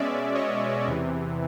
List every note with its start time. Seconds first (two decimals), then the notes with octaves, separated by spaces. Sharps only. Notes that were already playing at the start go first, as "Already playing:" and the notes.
Already playing: B2 G#3 C#4 D5 E5
0.34 C#5 D#5
0.87 E2 C3 E3